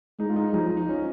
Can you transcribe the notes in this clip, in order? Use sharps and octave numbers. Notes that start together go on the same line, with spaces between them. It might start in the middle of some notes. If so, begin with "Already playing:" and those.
G#3 D#4
F4
D#4
F3 D#4
D#4
C#4